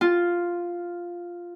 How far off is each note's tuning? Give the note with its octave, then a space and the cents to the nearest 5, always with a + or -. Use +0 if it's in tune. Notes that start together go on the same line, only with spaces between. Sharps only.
F4 +0